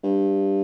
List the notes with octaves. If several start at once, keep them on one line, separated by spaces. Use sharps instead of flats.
G2